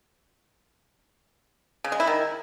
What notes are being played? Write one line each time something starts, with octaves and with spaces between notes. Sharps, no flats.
C#3
G#3
E4
D#3